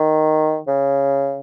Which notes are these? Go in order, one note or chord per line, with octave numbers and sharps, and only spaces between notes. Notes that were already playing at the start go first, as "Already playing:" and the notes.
Already playing: D#3
C#3